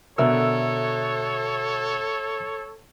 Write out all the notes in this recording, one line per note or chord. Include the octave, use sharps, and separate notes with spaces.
B2 D3 A4 A#4 C#5 E5 E6